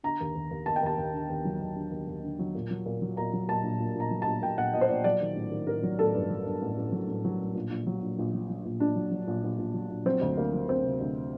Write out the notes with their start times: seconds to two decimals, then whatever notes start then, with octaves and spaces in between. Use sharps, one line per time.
0.04 D3 A#5
0.20 D#2
0.36 D#2
0.51 D#2
0.66 D#2 A5
0.76 G5
0.82 D#2 A5
0.97 D#2
1.14 D3
1.30 D#2
1.45 F#3
1.61 D#2
1.76 D3
1.91 D#2
2.07 D#2
2.23 D3
2.39 F#3
2.55 A#2
2.71 F#3
2.86 A#2
3.02 F#3
3.17 A#2 A#5
3.33 F#3
3.48 A#2 A5
3.64 A#1
3.80 A#1
3.95 A#1
4.00 A#5
4.11 F#3
4.22 A#1 A5
4.42 A#2 G5
4.57 A#1 F#5
4.74 A#2 D#5
4.81 C5
4.89 A#1 D5
5.04 F#3 D5
5.21 D#3
5.36 A1
5.51 D#3
5.67 A1 A#4
5.83 F#3
5.99 A1 A4
6.14 G2
6.30 F#3
6.45 G2
6.62 A1
6.78 A1
6.92 F#3
7.08 A1
7.25 F#3
7.40 A1
7.55 A#1
7.70 A#1
7.87 F#3
8.02 A#1
8.19 A#1
8.34 F#3
8.50 F#3
8.66 A#1
8.80 A#1 D4
8.96 F#3
9.11 F#3
9.27 A#1
9.44 A#1
9.59 A#1
9.74 F#3
9.90 A#1
10.06 F#3 C4
10.21 D2
10.37 D2 A#3
10.53 F#3
10.68 D2 C4
10.84 C3
11.00 D2